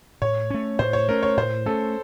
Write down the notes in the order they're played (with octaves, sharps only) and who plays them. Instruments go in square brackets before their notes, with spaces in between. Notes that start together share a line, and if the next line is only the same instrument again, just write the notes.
[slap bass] A2 [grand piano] C#5
[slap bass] A3 C#4
[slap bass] A2 [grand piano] C5
[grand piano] C#5
[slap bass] A3 C#4 [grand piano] A#4
[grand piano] C#5
[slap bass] A2 [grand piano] C5
[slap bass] A3 C#4 [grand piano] A4